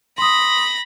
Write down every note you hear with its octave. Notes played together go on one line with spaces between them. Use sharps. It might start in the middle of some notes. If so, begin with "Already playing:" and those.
B5 C6 D#6 A#6